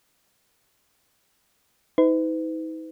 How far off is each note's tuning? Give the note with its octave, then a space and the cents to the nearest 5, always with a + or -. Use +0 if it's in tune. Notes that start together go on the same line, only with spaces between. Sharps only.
D#4 +40 B4 +40